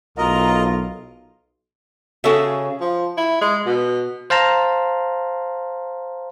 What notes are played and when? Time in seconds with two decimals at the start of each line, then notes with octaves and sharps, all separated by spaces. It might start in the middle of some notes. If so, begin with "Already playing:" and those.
0.18 B1 A2 F4 A#4 D#5 A#5
2.24 C#3 F#4 G#4 A4 E5
2.81 F3
3.17 E4
3.41 G#3
3.66 B2
4.30 C5 F5 A5 A#5